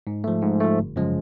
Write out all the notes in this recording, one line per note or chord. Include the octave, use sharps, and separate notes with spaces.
G#2
F3 A3
G#2
F3 A3
G1
F#2 C#3 F3 G#3